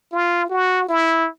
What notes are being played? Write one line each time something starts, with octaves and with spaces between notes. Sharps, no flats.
F4
F#4
E4